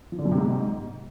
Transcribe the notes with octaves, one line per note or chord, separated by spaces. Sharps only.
F3
D3
F#2
C3
G#2